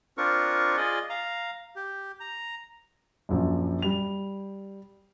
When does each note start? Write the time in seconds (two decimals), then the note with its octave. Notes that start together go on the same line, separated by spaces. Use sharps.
0.18 C4 D4 F4 A#4 C#6
0.77 F4 G#4 D5 D#5
1.10 F5 A#5
1.76 G4
2.20 A#5
3.29 A#1 F#2
3.82 G3 F7